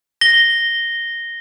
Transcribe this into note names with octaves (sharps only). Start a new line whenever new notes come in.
A#6 G7